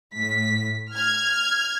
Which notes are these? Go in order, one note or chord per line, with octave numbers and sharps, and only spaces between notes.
A2 B6
F6 G#6